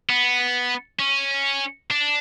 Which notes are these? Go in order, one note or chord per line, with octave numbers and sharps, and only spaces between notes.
B3
C#4
D4